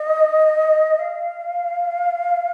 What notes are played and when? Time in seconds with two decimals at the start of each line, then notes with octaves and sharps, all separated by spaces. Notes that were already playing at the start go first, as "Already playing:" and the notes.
Already playing: D#5
0.99 F5